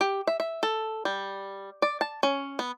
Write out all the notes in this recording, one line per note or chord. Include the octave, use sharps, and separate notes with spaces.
G4
E5
E5
A4
G3
D5
A5
C#4
B3